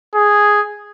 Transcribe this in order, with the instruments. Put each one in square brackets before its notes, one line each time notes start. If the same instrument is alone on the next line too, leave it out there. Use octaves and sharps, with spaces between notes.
[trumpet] G#4